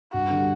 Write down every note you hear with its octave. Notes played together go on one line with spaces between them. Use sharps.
G2 F#4
D3 G3